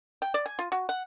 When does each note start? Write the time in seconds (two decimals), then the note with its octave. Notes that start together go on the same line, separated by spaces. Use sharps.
0.22 G5
0.34 D5
0.46 G#5
0.59 F4
0.72 F#4
0.89 F#5